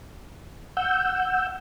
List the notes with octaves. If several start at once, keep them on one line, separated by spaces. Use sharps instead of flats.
F#5 E6 G6